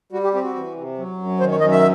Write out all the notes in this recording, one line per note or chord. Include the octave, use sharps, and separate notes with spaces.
G3 F#4
G4
C4 G4
F#4
E3
C3
F#3
F#2
D#3 C5
C#5
F#2 D#5
E5